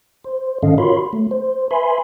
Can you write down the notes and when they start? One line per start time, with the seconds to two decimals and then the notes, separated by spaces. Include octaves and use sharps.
0.24 C5
0.63 G#2 D#3 C#4 A4 D#5 F5
0.78 F4 F#4 A#4 C#5 B5 C6
1.13 A3
1.31 C5
1.71 B4 E5 G#5 B5 C6